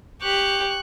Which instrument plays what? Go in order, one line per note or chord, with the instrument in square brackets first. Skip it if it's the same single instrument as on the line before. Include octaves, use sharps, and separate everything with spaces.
[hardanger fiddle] G4 [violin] C#6 F#6